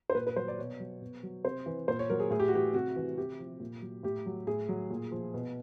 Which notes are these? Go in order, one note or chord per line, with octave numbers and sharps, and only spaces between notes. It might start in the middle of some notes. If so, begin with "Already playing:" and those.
C5
A#2 B4
B4
F#3 C5
D5
B2 C#5
F#3
B2
F#3
C3 C5
E3
A#2 C5
C#5
F#3 A#4
G#4
A2 G#4
G4
F#4
E3 G4
C3 F#4
E3
C3 G4
F3
A#2
F#3
A2 G4
F#3
A2 G#4
F#3
A#2
F3
B2